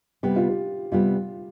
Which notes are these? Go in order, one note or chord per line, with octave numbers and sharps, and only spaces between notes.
C3 G3 B3 G4
F4
G4
C3 G3 B3 F4